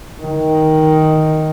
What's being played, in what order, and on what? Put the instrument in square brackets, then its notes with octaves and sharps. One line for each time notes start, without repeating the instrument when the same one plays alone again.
[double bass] D#3